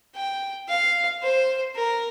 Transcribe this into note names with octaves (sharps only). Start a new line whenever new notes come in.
G5
F5
C5
A#4